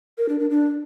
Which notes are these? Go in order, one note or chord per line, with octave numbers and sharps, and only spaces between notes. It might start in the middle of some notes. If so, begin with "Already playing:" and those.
A#4
D4
D4
D4